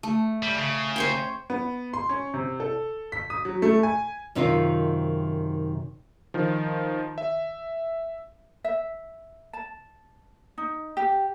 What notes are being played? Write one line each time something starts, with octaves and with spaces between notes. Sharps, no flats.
A3
G3
C#3
C5 C#5 G5
B3
C6
C#4
C3
A4
B6
D#6
F#3
A3
G#5
F#2 C3 D#3 C4 D#4 F4
D#3 F3
E5
E5
A5
D#4
G4